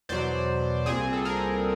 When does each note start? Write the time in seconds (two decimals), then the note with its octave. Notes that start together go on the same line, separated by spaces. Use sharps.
0.09 E2 B2 F#3 C5 D5
0.86 C2 A#2 G3 C4 G#4
1.13 A4
1.25 G#4 A#4